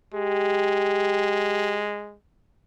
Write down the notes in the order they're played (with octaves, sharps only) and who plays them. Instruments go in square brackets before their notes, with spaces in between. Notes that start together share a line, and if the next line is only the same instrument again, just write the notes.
[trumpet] G#3 [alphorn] G4